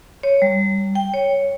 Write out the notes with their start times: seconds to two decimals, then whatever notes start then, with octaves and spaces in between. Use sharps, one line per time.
0.23 C#5
0.42 G3
0.95 G5
1.14 C#5